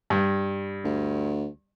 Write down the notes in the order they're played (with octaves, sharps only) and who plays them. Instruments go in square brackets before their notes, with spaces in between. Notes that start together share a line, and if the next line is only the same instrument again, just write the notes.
[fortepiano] G2
[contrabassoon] D2